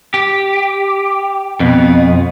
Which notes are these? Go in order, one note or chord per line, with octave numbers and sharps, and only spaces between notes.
G4
F2 B2